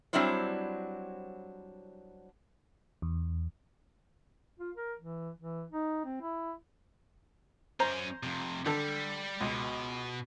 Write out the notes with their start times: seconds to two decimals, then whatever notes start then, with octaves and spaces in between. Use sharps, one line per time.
0.13 F#3 G3 C4 D4 E4 C5
3.02 E2
4.59 F4
4.76 A#4
4.99 E3
5.39 E3
5.71 D#4
6.05 C4
6.22 E4
7.80 F#2 C#4 C5 A#5
8.23 F2 C3
8.66 D3 G3 A4
9.41 C#2 B2